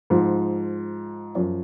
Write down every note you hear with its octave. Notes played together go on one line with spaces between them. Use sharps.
G#2 F3
F#2 F3